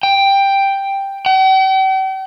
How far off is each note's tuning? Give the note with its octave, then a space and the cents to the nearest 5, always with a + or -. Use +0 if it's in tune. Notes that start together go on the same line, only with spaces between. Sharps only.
G5 +5
G5 -45